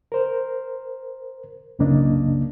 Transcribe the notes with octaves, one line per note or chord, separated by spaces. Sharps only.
A#4 C5
C2 F#2 C#3 A#3 D4 D#5